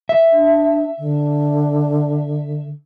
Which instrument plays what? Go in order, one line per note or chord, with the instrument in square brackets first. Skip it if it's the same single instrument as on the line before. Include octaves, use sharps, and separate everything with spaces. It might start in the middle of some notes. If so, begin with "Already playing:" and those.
[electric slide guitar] E5
[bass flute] D4
D3